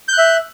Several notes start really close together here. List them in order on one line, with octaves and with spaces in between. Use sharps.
G6 F#6 E5